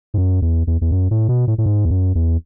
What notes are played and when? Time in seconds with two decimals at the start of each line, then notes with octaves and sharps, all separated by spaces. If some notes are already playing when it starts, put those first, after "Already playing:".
0.14 G#2
0.18 F#2
0.42 E2
0.67 E2
0.81 E2
0.91 F#2
1.11 A2
1.29 B2
1.47 A2
1.58 A2
1.66 G#2
1.85 E2
1.90 F#2
2.15 E2